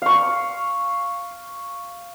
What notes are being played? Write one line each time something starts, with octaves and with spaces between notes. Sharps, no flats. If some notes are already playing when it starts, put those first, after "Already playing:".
F5 C#6